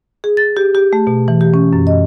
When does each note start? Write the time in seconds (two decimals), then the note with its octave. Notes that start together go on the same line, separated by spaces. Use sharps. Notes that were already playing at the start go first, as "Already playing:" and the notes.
0.24 G#4
0.37 A6
0.57 G4
0.75 G4
0.93 A3
1.07 B2
1.28 E3
1.41 G4
1.54 C#4
1.73 F#2
1.87 D#5